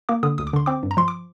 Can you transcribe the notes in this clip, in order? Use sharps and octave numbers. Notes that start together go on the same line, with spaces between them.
A#3 D6
D3 D#6
D2 D#6
D6
D3 C6
C4 D6
G2
A#5
F3 C6
D6